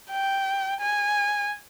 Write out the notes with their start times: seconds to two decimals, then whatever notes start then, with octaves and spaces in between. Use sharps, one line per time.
0.11 G5
0.80 G#5